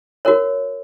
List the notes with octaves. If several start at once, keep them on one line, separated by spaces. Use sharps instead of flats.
F#4 A#4 C#5